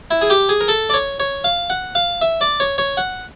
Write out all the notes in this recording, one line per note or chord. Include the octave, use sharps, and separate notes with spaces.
E4
G#4
G4
G#4
A#4
A4
D5
C#5
C#5
F5
F#5
F5
E5
D5
C#5
C#5
F#5